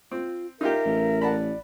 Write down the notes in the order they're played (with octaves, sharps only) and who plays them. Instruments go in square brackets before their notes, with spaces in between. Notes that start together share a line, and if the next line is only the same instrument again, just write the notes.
[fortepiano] C4 [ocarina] F4
[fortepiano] D#4 F4 G4 [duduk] A#4 [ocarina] E5
[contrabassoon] A1
[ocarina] D5 [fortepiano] F#5 A5 B5